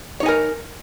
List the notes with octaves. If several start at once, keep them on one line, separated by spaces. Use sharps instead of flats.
D#4 A#4 C#5 G#5